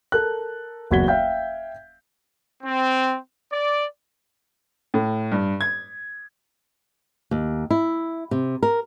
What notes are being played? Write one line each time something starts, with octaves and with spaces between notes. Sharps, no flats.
A4 A#4 F#6
F#1 E2 F#4 G#6 B6 G7
E5 F5 G5 G6
C4
D5
A2
G2
G#6
D#2
E4
C3
A#4